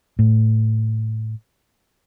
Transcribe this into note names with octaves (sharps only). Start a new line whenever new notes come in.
A2